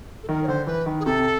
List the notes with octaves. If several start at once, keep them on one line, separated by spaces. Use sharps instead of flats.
A4
D#3 A#4
C#5
D3 C5
E3 B4
D#3
G#4
C3 A4